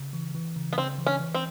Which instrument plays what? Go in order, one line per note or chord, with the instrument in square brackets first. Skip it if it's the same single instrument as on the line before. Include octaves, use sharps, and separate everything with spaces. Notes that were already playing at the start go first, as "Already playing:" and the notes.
Already playing: [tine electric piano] C#3
E3
E3
C#3
[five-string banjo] B3
[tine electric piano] C#3 [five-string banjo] C4
[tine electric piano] E3
[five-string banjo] C#4
[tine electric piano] E3
[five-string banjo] C4